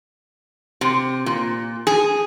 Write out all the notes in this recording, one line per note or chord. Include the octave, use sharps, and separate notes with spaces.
C3
A#2
G#4